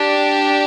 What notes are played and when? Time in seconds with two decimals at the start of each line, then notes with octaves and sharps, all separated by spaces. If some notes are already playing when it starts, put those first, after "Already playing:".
Already playing: D4 G4